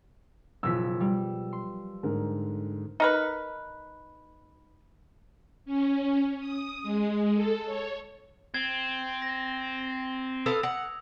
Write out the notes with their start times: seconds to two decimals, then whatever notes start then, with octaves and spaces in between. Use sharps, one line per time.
0.63 F#1 B2 F3 E6 B6
1.00 G3
1.53 C6
2.03 G#2 D3 A#4
3.00 D#4 A#4 B4
5.65 C#4
6.40 D#6
6.83 G#3
7.34 A4
7.66 C#5
8.54 C4 G#6
9.22 A#6
10.46 A4 B4 F5 D#6 E6 F7
10.63 F#5